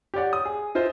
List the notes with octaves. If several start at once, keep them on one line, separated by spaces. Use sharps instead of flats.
G4 C#5 D5 F#5
D#6
G#4
D#4 F4 C5 D#5 E5